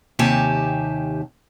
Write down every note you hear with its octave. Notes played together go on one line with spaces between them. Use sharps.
D#2 C3 G4 G#5 A5